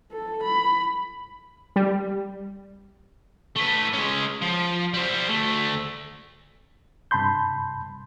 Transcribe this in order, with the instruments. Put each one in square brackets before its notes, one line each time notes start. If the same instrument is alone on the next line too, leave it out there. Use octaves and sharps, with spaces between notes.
[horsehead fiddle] A4
B5
[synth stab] G3
[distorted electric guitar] A3 B4
G#3 C#4
F3
G3 C5
D2 A3
[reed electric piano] G2 C3 A5 B5 C6 G6